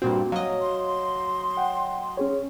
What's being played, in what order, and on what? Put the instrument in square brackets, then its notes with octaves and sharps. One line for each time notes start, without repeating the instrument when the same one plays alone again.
[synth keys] G2 A#2 C4 [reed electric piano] F#4
[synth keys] F#3 D#5 [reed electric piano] F5
[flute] C6
[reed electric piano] F#5 G5
C#4 G#4 C#5